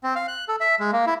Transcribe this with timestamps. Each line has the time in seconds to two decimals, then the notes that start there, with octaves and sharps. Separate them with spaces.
0.03 C4
0.16 F5
0.28 F#6
0.48 A4
0.60 E5
0.80 G#3
0.93 A#3
1.06 E4